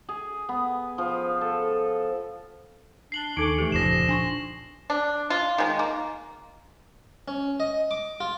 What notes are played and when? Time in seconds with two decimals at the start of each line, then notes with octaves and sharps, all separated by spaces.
0.09 G#4
0.49 B3
0.98 F3
1.41 A4
3.12 D4 C7 F#7 G7
3.37 D#2 D#4 A4 G#5 C#6 D6
3.58 E3 A3 G4
3.72 F1 C#2 A#2 F3 A#6 C7 E7
4.09 D4 G#5 C6 C#6
4.90 D4
5.30 F4
5.58 D#3 G#3
5.79 A#3
7.28 C#4
7.60 D#5
7.91 D6
8.20 F4